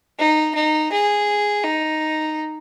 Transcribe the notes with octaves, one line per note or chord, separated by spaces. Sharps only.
D#4
D#4
G#4
D#4